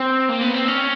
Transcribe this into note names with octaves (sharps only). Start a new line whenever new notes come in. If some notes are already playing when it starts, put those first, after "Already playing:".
Already playing: C4
A#3
B3
C4
C#4